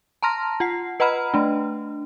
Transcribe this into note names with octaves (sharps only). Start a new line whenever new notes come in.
A5 A#5 C6 F6 A#6
F4 F#5 C7
B4 D#5 F#5 A#5 B5 F6
A3 D4